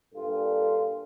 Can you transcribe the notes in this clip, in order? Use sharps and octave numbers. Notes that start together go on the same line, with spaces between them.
G2 A#2 F4 A4